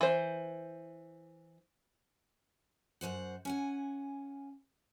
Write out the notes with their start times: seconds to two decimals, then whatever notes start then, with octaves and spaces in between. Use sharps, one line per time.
0.01 E3 C5
3.01 F#2 F3 C5 F#5
3.45 C#4 F#5 G#5